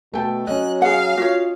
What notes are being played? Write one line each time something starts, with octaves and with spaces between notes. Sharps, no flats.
B2 A3 G5 A5
F#3 C#4 D#5 F#6
G#4 F5 F#5
F4 F#4 C#5